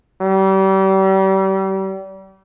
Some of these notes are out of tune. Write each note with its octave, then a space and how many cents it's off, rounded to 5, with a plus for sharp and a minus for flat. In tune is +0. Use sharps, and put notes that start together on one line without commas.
G3 -35